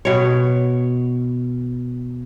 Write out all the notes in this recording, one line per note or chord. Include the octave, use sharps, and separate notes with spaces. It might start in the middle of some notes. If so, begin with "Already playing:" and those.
B2 C#5